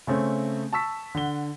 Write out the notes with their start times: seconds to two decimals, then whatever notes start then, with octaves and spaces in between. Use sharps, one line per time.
0.07 C#3 A3 C4 C#4
0.73 A5 C#6 E6 B6
1.15 D3 F#5 G7